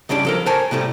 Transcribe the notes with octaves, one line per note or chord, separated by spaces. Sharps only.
C#2 C#3 G3 D4 D5
F3 A4 A#4
A#4 C5 C#5 G#5 A5
A2 C3 G3 A3